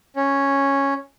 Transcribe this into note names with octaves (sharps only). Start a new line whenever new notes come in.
C#4